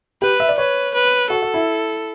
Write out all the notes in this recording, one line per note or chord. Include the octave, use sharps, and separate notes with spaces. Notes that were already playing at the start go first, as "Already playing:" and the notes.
G4 B4
E5
D5
B4 C#5
B4
F#4 A4
F#4
E4